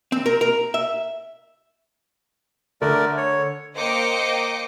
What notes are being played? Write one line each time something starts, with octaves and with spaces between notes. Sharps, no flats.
C4
A#4
A#4
E5
D3 A3 A#4 D5
C#5
A#3 C5 D#5 G5 D6 C#7